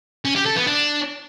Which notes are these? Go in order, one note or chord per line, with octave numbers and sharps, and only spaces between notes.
C#4
G4
A4
B3
D4